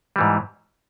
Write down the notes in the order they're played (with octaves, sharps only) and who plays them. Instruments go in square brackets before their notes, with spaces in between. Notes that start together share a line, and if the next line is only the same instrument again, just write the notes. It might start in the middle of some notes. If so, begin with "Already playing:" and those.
[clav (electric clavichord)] G#2 E3 G3